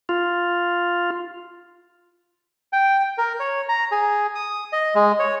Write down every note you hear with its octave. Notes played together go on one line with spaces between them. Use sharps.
F4
G5
A#4
C#5
A#5
G#4
D#6
D#5
G#3
C#5